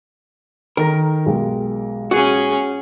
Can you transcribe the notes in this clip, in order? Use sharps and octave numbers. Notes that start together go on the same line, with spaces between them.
D#3 A4 A#4 A#6
B1 G#3 G4
C#4 F#4 G#4